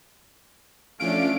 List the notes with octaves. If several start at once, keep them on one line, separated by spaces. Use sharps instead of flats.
F3 A3 C#4 D4 F5 D7